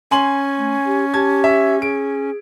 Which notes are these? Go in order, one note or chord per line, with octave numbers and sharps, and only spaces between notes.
C#4 G#5 C6 F#7
A3
G4
G4 A5 G#6
E5
G#4 D7